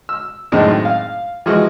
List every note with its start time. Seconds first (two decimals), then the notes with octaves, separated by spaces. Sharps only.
0.09 E6
0.52 F#2 A2 D#3 G#3 C4 D4
0.85 F5
1.46 E3 F3 G#3 F#4